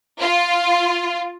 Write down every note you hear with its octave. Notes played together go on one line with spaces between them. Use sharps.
F4